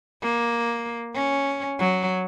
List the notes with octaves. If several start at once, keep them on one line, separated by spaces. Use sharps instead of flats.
A#3
C#4
F#3